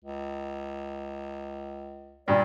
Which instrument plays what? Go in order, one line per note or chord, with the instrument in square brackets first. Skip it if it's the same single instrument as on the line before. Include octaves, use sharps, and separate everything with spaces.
[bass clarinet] C#2
[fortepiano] G2 A#2 [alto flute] D5